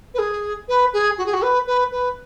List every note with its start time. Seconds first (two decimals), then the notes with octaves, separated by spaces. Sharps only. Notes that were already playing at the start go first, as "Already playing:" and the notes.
0.14 B4
0.19 G#4
0.68 B4
0.93 G#4
1.18 F#4
1.26 G#4
1.33 F#4
1.42 B4
1.66 B4
1.91 B4